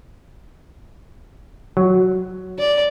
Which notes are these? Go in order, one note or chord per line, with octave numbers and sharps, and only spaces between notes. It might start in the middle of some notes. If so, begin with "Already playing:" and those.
F#3
D5